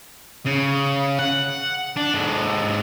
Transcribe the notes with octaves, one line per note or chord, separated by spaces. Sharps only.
C#3
F#5
D4
G#2 A4